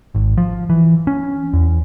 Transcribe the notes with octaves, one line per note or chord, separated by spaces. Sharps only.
G#1
F3
E3
C#4
E2